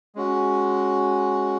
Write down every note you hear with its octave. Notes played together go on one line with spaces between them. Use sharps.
G#3 C#4 F#4